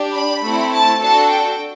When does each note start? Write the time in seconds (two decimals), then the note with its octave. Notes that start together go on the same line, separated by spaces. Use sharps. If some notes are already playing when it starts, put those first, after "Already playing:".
Already playing: D4 G4
0.13 B5
0.43 A3 C4 E4
0.71 A5
0.99 D4 F#4 A4 A5
1.29 G5